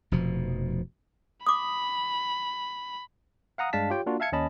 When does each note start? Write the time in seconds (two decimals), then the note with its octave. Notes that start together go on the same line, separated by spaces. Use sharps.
0.12 F1 B2 F3
1.47 B5 D6 D#6
3.58 F5 F#5 A#5 D#6
3.73 G2 G#3 D4 F5 A5 B6
3.90 F4 G4 C#5 G5
4.06 A#3 D4 F4 F#4
4.20 E5 F5 A5 G#6 C#7
4.32 D#2 C#4 D#5 A5 B5